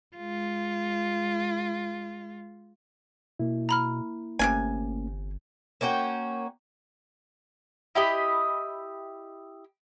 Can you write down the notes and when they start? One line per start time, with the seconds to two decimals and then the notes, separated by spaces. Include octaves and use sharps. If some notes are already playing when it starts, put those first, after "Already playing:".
0.17 G#3 F4
3.39 B2 A#3 E4
3.69 A#5 B5 F6
4.39 G1 C3 A3 A#3 C#4 F4 G#5
5.81 A#3 C#4 F#4 G5
7.95 E4 G4 D#5 B5